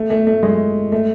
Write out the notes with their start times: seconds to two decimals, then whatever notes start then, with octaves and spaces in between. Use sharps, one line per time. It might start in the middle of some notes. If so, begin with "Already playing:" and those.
Already playing: A3
0.10 A3
0.27 A3
0.43 G#3
0.92 A3